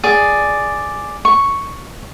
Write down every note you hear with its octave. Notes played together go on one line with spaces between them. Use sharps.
G#4 D5
C#6